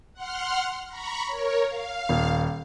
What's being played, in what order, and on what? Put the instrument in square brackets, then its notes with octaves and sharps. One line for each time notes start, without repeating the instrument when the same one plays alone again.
[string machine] F#5 C6 F6
A#5 B5 C#6
A#4 C#5
F5
[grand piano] D#1